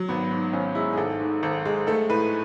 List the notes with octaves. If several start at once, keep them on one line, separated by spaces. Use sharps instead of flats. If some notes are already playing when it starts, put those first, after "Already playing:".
Already playing: F#3
G#1 B3
G#2
G#1 C#4
G#3 E4
G#4
G#1 A4
G#2
G#1 A4
G#3
A3 A4
A2 B4